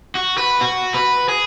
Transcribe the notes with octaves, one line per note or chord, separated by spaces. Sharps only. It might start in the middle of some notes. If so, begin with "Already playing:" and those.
F#4
B4
F#4
B4
G#4